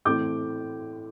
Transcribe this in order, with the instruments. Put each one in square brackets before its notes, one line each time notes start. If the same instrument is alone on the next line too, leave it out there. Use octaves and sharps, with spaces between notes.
[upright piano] A2 E3 A3 C4 D6 G6